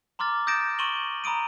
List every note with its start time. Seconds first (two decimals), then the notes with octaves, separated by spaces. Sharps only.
0.19 A#5 C6 D6 F6 A6
0.47 D#6 G6 A6 A#6 D7 E7
0.79 C6 C#6 D#7 E7 F#7 G7
1.24 A#5 B5 D#6 D7 D#7